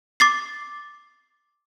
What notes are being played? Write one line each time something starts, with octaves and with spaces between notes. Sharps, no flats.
D6 A6 C7